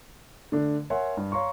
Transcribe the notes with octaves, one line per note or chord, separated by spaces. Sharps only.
D3 A3 D4
A#4 C#5 E5 F#5 G#5 C6
G2
C#5 F5 A#5 C6 C#6